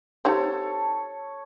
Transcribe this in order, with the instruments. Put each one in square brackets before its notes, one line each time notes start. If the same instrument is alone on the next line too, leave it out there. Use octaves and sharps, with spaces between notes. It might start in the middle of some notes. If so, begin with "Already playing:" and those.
[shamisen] C4 D#4 G4 [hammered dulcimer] A4 C#5